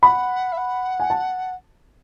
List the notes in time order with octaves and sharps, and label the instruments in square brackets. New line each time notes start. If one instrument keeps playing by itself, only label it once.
[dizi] F#5 [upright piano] B5
[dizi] E5
F#5
[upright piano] G#5
A5